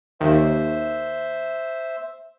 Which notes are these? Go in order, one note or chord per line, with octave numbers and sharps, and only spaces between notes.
D#2 C5 E5